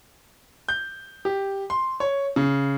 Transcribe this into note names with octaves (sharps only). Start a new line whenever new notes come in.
G6
G4
C6
C#5
C#3